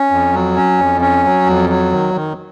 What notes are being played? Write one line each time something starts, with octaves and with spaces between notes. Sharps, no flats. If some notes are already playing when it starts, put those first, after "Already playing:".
Already playing: C#4
F2
F#3
C#4
F2
C#4
F#3
F2
F#3
D#3
D#3